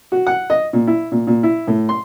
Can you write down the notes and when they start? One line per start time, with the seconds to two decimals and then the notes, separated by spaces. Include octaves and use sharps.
0.12 F#4
0.27 F#5
0.50 D#5
0.73 A#2
0.87 E4
1.12 A#2
1.27 A#2
1.43 E4
1.68 A2
1.89 C6